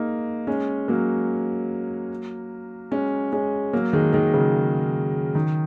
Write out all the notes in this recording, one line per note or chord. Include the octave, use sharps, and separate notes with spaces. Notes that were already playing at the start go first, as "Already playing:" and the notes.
Already playing: G#3 A#3 D#4
G#3 C#4
F#3 A#3
G#3 C#4
G#3 C#4
F#3 A#3
D#3 G#3
D#3 G#3
C#3 F#3
D#3